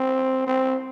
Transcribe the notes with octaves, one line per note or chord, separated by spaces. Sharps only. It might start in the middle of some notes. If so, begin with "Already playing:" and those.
Already playing: C4
C4